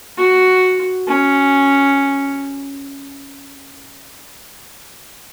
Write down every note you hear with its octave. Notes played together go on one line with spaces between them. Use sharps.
F#4
C#4